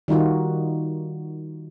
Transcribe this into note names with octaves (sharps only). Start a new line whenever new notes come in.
D#3 G3 D#4 F4 F#4